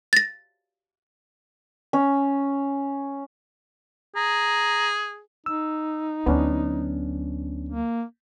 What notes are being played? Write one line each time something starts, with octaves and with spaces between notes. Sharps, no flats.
A6 A#6
C#4
G#4 A#5
D#4 E6
D2 F#3 B3 C#4 D4
A#3